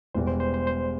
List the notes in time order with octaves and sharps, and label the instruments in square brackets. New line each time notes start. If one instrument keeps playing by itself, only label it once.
[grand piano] E1 E2 B2 G3 [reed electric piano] C5
[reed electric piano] C5
C5
C5
C5